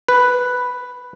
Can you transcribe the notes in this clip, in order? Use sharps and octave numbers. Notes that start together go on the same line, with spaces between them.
B4